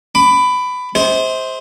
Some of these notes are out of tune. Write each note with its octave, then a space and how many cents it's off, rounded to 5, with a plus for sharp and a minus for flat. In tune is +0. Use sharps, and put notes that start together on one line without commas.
B5 +15 D6 +0
G#4 -30 C5 +0 E5 -45